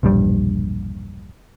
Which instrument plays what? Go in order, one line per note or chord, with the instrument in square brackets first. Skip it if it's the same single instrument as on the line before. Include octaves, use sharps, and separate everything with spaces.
[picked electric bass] E1 A#1 G2 G3